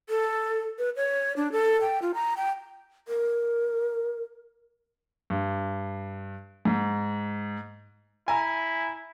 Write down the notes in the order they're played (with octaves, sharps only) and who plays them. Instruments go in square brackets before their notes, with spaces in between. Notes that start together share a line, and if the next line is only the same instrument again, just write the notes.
[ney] A4
B4
C#5
D4
A4
G5
F4
A#5
G5
[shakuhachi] A#4
[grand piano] G2
G#2
[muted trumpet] E4 [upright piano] G#5 A#5